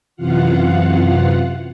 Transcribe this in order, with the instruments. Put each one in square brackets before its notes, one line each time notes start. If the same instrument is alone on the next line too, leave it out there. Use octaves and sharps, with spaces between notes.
[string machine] F#2 C3 E3 F4 F5 F#5